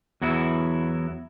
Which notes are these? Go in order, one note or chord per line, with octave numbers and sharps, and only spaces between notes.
E2 F#3 B3 E4